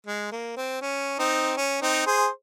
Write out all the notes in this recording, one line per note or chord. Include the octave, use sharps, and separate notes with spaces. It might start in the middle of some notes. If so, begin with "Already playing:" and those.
G#3
A#3
C4
C#4
C4 D#4
C#4
C4 D#4
G#4 C5